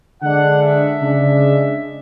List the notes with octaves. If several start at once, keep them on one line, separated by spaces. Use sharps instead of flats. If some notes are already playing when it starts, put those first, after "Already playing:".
D3 G#3 D4 F#5
E5
C#3 G#3 D4